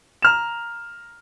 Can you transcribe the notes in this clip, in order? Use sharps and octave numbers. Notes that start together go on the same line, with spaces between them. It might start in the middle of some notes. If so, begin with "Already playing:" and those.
A#5 F6 E7